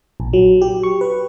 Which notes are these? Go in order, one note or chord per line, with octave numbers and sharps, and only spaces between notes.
A#1
F#3
G4
C#6
B4